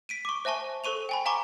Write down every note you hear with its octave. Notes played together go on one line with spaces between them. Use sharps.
B6 D7 D#7
C#6 D6
C5 E5 G#5 A5 C#6
A4 C5 C#6 D#7 F7
G5 G#5 B5
F5 G#5 A#5 C#6 D6